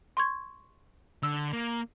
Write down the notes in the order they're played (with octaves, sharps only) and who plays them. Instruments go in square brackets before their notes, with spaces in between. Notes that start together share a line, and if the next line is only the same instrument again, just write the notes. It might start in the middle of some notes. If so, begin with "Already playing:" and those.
[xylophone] C6 C#6 G#6
[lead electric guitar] D3 [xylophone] E6
[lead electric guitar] A#3